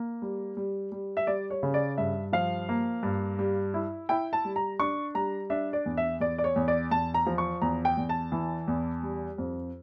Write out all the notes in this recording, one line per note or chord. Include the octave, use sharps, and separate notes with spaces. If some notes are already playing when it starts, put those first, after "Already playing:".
Already playing: A#3
G3
G3
G3
E5
G3 D5
C#5
C#3
D5
G2 E5
F3 F5
A#3
G2
G3
E4
E4 G5
A5
G3
A#5
D4 C#6
G3 A#5
D4 E5
D5
E2
E5
E2 D5
D5
C#5
E2
D5
E2 A5
A#5
F3
C#6
E2 A#5
G5
E2
A5
E3
E2
G3
F2